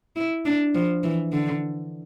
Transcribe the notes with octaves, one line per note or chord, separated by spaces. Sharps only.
E4
D4
F3
E3
D3